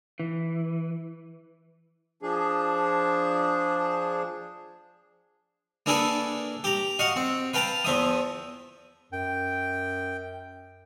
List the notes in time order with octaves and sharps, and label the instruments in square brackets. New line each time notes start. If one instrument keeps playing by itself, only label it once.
[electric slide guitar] E3
[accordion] F3 D4 G#4
[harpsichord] A#3 D4 E4 G#4 A4 B4
G4 A#5
F#4 D#5 F5 F#5
C4
B4 F5 G5 A5 A#5
E2 F3 E5 D#6
[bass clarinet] F#2 [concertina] G5